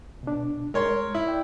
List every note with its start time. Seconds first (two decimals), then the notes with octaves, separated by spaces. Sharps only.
0.23 B2 D4
0.74 G#3 A#4 C#5 C6
1.15 E4
1.26 D5 E5 G5